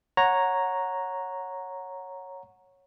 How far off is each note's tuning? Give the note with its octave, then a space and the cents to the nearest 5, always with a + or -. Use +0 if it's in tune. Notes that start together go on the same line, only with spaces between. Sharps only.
C#5 -5 F#5 -10 A#5 +0